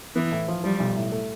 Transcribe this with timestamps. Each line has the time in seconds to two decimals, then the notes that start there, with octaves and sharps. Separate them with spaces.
0.15 E3 B3
0.31 A2
0.48 F3
0.64 F3 G3
0.80 B1
0.96 A2
1.12 A3